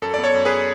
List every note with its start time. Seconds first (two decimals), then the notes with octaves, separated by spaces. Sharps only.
0.02 F#2 A4
0.14 B3 D5
0.24 A4 C#5
0.34 F#2
0.45 G#4 B4